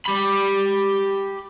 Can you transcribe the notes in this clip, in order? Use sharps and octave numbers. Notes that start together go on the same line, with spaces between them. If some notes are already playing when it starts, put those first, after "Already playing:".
G4 B5